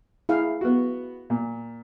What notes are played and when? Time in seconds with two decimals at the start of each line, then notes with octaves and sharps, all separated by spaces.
0.29 E4 G#4 F5
0.61 B3 F#4
1.30 A#2